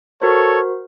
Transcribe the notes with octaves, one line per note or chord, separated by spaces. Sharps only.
F#4 A4 A#4 C5 C#5